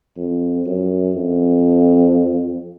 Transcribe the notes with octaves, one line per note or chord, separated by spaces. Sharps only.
F2
F#2
F2